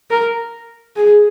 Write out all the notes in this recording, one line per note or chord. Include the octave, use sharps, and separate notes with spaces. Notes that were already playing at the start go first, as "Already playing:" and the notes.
A#4
G#4